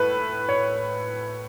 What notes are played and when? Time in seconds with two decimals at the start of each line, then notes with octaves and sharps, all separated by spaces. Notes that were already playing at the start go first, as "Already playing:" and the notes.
Already playing: A2 A4 B4
0.49 C#5